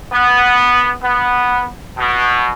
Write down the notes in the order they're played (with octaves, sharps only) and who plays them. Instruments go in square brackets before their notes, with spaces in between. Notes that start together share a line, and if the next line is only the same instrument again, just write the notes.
[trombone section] B3
B3
B2